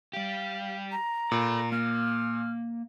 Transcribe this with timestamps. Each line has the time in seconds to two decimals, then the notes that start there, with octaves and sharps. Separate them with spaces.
0.13 G3 G4 F5
0.92 A#5
1.32 A#2 A4 B5
1.72 A#3 F6